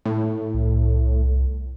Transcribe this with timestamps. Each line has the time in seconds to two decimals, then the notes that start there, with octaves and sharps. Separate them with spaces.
0.05 A2
0.54 C2